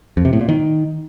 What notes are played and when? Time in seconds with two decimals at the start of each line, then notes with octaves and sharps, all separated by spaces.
0.17 F2
0.25 C3
0.33 A2
0.41 A#2
0.49 D#3